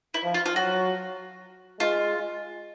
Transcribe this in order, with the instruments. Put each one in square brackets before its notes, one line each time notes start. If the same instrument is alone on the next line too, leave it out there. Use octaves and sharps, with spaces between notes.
[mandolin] E4
[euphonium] F3
[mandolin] F4
F4
[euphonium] F#3 [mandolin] F#4
[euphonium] G#3 [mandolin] F4